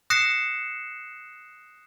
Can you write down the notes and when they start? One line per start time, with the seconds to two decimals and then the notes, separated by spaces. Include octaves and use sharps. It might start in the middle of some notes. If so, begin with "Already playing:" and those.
0.10 D#6 F#6 A#6 C7 C#7 E7